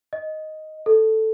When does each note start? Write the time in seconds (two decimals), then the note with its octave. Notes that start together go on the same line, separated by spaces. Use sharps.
0.13 D#5
0.86 A4